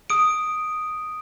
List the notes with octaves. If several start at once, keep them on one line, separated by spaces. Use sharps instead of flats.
D#6 D7